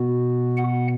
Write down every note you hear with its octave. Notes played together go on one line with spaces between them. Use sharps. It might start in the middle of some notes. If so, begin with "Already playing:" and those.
Already playing: B2 B3 F#4
F#5